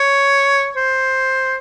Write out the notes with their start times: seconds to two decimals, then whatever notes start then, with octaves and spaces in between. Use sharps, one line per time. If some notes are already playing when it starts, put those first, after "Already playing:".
Already playing: C#5
0.76 C5